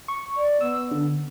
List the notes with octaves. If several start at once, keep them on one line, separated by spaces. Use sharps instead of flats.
C#6
D5
B3 E6
D3